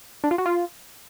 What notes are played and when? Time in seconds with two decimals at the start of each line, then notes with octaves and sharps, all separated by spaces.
0.24 D4
0.31 F4
0.38 F#4
0.46 F4